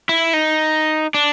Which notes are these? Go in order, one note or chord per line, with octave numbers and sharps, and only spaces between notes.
E4
D#4
D4